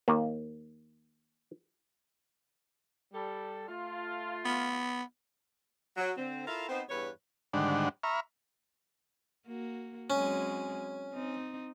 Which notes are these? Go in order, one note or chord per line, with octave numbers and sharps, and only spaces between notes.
D#2 A#3
G3 A4
A3 F4
B3
F#3
D3 C4
E4 F4 A4 A#4 E5 F5
B3 C4 D#4 C5
E2 G2 B4 C#5
G#2 D3 D#3 G3 D4 F#5
E5 A#5 B5 C#6 F6
A#3 F#4
F#3 G#3 C4 C#4
C4 D#4